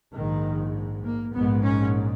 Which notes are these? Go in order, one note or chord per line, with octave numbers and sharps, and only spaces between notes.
A#1 G#2 D#3
A#3
A#1 G#2 B3
C#4